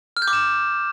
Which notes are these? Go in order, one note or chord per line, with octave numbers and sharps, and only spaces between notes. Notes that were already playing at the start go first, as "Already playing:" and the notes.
F6
G6
D6
E7